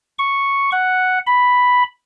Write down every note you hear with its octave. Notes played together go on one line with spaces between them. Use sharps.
C#6
F#5
B5